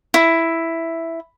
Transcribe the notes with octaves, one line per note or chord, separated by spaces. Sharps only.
E4